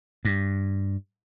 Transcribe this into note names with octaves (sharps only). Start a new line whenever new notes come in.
G2